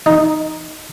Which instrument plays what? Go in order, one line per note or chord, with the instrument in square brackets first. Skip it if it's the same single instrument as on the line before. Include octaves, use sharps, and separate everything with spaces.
[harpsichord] D#4